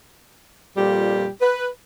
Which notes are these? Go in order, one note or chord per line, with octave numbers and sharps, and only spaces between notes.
F2 A#2 G3 G4
B4